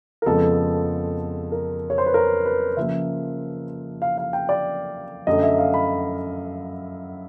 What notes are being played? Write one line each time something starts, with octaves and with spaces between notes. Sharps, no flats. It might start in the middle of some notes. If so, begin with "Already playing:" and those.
A#4
F2 C#3 F3 G#3 B3 A4
A#4
C#5
C5
B4
A#4
B4
C#3 F3 A#3 E5
F5
F5
G5
D5
F#2 D3 F#3 A3 D#5
E5
F5
B5